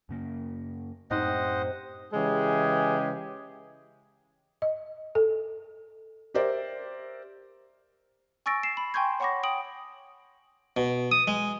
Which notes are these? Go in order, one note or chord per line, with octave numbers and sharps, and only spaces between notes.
F#2 C#3 A#3
F#2 A2 C3 D#4 C5 D#5 F#5
C#3 E3 G#3 G4 G#4
D#5
A4
G4 A#4 C5 D5 E5
G#5 C#6 E6 A6 A#6 D7
C7 E7
B5
G5 G#5 C6 C#6 G6 G#6
C#5 F#5 B5 C#6 D6 A#6
G5 D#6 D7 F#7
B2
D#6
G#3